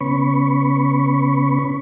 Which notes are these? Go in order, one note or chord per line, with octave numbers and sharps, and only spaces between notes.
C#3 B3 C#4 B5 C#6